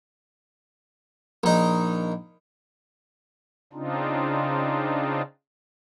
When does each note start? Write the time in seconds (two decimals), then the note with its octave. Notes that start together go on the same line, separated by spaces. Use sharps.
1.44 A#1 D#4
3.73 C#3 C4 D4 D#4 F4